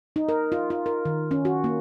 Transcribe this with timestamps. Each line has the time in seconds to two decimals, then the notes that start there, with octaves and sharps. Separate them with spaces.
0.16 D#4
0.29 A#4
0.52 F4
0.70 F4
0.86 A#4
1.05 D#3
1.31 C#4
1.45 F#4
1.64 A#3